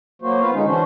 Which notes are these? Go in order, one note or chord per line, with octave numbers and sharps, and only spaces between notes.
F#3 A#3 F#4 C5
B3 F4 B4 C5 F5
D3 G#3 C#4 D#4
E3 C#4 D4 F#4 C5